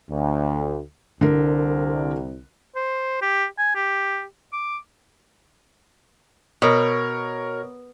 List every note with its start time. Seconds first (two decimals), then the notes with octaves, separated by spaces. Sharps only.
0.10 D2
1.21 C2 D3 A#4
2.76 C5
3.22 G4
3.58 G#5
3.75 G4
4.53 D6
6.62 B2 A#4 C#5 C#6